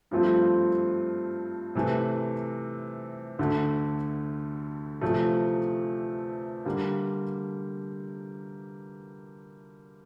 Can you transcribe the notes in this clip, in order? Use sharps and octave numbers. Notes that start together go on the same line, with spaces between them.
G2 F3 A3 C4 F4
C3 E3 A3
D2 D3 A3
E2 C3 F3 A3
D3 G3 A#3